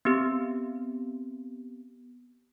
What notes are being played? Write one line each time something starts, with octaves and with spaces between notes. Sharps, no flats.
B3 C4 G4